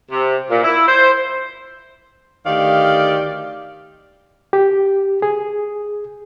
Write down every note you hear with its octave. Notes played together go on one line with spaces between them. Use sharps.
C3
A#2
E4
C5
D2 D#3 G4 D5 F5
G4
G#4